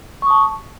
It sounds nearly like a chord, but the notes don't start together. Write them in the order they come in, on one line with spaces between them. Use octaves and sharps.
C#6 D#6 A5